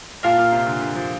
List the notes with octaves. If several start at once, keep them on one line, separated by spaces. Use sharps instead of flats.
A#2 F4 A#4 F5 A5
A#2
C3
D3
D3
F3